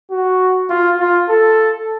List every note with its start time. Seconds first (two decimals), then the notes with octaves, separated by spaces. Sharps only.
0.11 F#4
0.70 F4
1.00 F4
1.30 A4